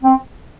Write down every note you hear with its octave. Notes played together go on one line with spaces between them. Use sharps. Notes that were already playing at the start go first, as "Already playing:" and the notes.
C4